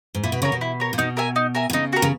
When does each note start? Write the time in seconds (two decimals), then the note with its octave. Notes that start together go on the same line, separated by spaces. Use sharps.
0.15 G#2
0.24 A#2 E4
0.32 B2
0.42 C#3 A#4 C#5
0.52 B2
0.61 E4
0.80 A#4 C#5
0.93 A#2
0.98 B2 D#4
1.17 A#4 E5 G#5
1.36 D#4
1.55 A#4 E5 G#5
1.70 B2
1.73 C#3 D#4
1.93 F#4 A#4
2.02 C#3